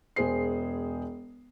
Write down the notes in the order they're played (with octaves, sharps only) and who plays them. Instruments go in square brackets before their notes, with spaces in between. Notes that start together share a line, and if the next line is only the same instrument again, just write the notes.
[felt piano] E1 G#4 C5 C7